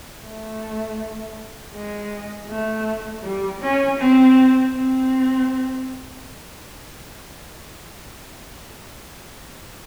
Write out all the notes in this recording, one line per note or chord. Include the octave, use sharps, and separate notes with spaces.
A3
G#3
A3
G3
C#4
C4
C4